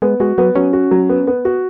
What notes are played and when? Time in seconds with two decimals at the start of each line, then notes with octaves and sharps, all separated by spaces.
0.02 G#3 B3
0.20 G#3 F#4
0.38 F#3 B3
0.55 F#3 C#4
0.73 F#4
0.91 F#3
1.09 B3
1.27 B3
1.45 F#4